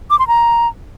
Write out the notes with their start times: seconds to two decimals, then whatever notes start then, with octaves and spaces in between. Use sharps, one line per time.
0.11 D6
0.19 C6
0.28 A#5